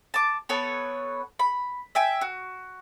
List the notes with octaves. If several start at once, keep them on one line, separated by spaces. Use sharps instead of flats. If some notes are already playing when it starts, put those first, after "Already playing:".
A5 D6
B3 A4 B4 C#5
B5
E5 G5 G#5
F#4